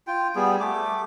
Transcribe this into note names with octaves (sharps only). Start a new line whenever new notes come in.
F4 G5
G3 B3 G#4
A3 D6